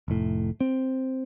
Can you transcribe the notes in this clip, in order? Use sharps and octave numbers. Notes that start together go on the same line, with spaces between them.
F1 A2
C4